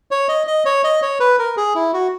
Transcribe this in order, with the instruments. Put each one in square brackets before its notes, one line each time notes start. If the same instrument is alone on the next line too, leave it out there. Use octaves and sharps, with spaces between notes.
[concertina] C#5
D#5
D#5
C#5
D#5
C#5
B4
A#4
G#4
E4
F#4